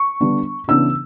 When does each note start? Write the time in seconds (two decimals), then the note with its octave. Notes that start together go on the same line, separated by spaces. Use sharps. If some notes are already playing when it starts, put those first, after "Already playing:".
Already playing: C#6
0.21 D3 G3 B3 D4
0.68 C#3 E3 B3 D4 E6